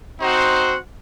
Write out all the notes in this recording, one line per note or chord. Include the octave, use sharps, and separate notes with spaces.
C4 D#4 F#4 C5 F#5